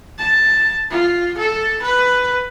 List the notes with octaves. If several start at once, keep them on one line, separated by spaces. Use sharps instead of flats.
A5
F4
A4
B4